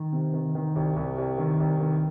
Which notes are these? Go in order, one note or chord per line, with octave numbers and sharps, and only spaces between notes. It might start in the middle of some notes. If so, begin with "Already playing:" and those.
Already playing: D#3
C3
D#3
D#3
C2
C2
C2
D#3
C2
D#3